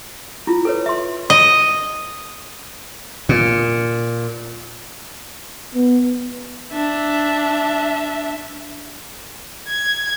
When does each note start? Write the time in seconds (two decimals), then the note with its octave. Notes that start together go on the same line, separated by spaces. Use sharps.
0.47 E4 F4
0.65 A4 B4 C#5
0.86 E5 C6
1.30 D#5
3.29 A#2
5.75 B3
6.73 D4 E5
9.68 G#6